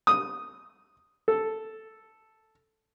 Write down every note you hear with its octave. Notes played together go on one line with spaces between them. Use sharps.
D#6
A4